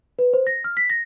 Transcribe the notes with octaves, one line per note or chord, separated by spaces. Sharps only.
B4
C5
A#6
F6
B6
A#6